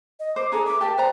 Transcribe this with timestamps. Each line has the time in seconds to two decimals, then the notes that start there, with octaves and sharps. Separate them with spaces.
0.20 D#5
0.36 C5 D6
0.52 D4 G#4 A4 A#5
0.66 B4 E5 D6
0.81 G4 A#4 G5 A5
0.98 B4 C5 D5 A#5